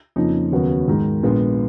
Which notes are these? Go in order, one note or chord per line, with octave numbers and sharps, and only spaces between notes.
F2 C#3 F3 A#3 D#4
D#2 C#3 F#3 B3 F#4
G#2 D#3 G#3
A#1 A#2 G#3 B3 F4